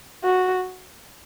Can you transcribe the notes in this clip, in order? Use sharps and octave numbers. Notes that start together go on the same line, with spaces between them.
F#4